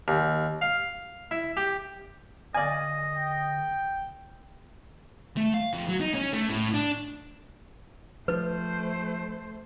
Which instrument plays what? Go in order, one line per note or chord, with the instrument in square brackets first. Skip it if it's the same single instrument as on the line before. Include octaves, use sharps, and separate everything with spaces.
[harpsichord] D#2
F5
E4
G4
[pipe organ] D3 [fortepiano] D5 F5 G#5 [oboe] D#5
[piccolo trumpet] G5
[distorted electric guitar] A3
F5
F2
F#3
D#4
C#4
A3
A2
D4
[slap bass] F3 [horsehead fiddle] A3 C5 [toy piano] B4